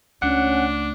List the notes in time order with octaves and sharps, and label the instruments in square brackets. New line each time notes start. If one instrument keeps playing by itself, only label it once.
[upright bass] C#2 A3 [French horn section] C#4 [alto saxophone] D4 [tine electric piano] F#5